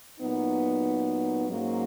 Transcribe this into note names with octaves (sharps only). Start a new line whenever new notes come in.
A#2 F#3 B3 D#4
G#2 F#3 A#3 C#4